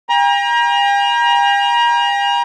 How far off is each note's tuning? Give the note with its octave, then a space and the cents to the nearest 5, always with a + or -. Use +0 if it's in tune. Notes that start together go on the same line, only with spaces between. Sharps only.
G5 +45 A#5 +30